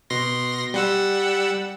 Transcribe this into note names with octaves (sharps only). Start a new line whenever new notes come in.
B2 C6 A#6
G3 F#5 E6